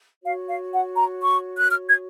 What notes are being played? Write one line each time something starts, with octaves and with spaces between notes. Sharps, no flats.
F#4 C#5 F5
F5
F#5
A#5
C#6
F#6
F6
G#6